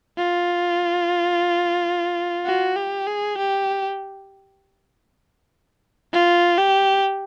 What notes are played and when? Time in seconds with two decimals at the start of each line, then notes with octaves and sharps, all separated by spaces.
0.18 F4
2.46 F#4
2.77 G4
3.07 G#4
3.38 G4
6.13 F4
6.58 G4